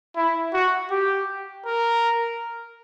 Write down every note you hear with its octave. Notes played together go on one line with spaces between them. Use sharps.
E4
F#4
G4
A#4